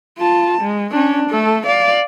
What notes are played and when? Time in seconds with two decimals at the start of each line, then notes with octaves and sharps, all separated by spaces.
0.18 F4 A5
0.62 G#3
0.91 C#4 D4
1.30 A3 A4
1.67 D5 F5